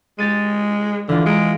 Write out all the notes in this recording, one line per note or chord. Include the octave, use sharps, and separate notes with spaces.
G#3 G4 A6 D#7
D3 E3 F4
G#3 A#5 D7